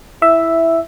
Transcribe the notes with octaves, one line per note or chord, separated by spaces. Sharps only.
E4 E5